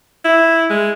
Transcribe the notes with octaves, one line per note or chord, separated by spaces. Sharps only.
E4
G#3